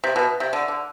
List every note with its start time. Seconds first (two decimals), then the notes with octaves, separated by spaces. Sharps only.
0.04 C3
0.16 B2
0.40 C3
0.53 D3
0.68 D3